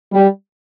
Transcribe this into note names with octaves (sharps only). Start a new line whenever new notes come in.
G3